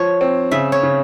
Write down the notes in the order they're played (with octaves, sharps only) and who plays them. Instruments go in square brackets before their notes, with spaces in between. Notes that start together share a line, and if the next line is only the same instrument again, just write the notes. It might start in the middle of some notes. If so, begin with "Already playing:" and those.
Already playing: [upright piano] F3 [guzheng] C#5
[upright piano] C4
[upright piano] C#3 [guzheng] E5
[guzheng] C#5
[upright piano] C#3